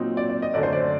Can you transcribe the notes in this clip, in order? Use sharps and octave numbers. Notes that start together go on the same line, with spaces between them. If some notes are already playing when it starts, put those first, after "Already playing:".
Already playing: A#2 F#3 C4 D#4
D5
D5
D#5
F#2 D3 A3 D5
C5
D5